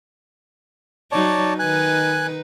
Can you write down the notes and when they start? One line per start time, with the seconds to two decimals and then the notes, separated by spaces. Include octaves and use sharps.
1.12 F#3 D#4 C#5 D5 A5
1.59 D#3 D#4 B4 G#5 F#6